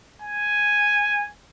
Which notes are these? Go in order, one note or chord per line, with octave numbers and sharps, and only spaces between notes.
G#5